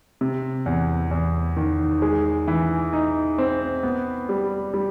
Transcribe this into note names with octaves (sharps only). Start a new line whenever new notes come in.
C3
E2
E2
D#3
G#3
E3
D#4
C4
B3
G3
G3